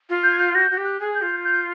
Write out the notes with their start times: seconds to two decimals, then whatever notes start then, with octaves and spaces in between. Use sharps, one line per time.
0.09 F4
0.23 G6
0.31 G#6
0.39 G6
0.54 F#4 G6
0.71 F#4
0.77 G4
0.84 F#6
1.00 G#4
1.15 G6
1.21 F4
1.44 G6